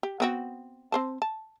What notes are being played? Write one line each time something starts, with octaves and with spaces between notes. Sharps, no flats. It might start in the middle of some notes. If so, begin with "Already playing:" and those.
G4
B3 C4 F#4
C4 C5 A5
A5